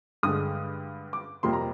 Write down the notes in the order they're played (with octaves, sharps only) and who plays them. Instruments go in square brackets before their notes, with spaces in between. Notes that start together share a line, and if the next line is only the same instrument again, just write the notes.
[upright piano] G2 D3 G#3 D#6
D6
F2 C3 G3 A#3 C6
A#5